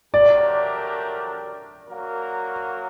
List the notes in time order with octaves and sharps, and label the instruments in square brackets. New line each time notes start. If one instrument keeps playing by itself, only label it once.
[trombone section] F#3 A3 D4 G4 A#4 [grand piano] D5
[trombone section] F#3 A#3 F#4 A#4